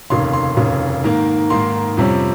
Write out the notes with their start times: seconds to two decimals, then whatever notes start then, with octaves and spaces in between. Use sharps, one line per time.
0.10 F1 D#2 C#3 C6
0.33 C6
0.57 F1 D#2 C#3
1.04 G#2 D#3 A#3
1.50 G#2 D#3 A#3 C6
1.97 F2 C3 G3 C#4